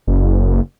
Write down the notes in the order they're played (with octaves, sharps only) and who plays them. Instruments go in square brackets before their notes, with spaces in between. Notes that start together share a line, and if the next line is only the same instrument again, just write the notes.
[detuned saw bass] F#1